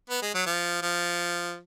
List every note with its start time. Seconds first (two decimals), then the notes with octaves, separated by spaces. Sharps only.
0.10 B3
0.22 G#3
0.34 F#3
0.46 F3
0.82 F3